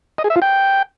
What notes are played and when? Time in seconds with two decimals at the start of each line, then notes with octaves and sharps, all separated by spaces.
0.18 D#5
0.24 G#4
0.30 E5
0.36 F4
0.42 G5